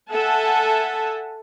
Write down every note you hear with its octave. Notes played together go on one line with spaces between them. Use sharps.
A4 E5 F#5 G#5 A5